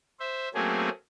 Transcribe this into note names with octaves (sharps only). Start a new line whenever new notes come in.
C5 E5
F#3 A3 A#3 C4 C#4 G#4